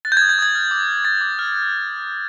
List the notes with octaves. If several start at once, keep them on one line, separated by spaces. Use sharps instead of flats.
F#6 A6
G6
G#6
D#6
G6
D#6 G#6
F6
D6
F6
D6 A6
D6
F6